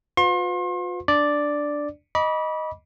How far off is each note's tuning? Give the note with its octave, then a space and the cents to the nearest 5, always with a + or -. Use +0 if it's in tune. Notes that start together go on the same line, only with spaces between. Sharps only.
F4 +40 B4 +35 C6 +40
D4 +0 D5 +0
D#5 +0 B5 -25 D6 -25